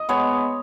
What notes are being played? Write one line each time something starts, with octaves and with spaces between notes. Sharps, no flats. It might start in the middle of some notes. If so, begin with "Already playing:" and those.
Already playing: D#5
G#3 B3 C#5